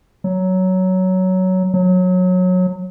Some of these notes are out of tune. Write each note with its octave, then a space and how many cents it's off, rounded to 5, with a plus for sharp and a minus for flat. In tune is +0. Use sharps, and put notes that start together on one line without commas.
F#3 +10
F#3 -20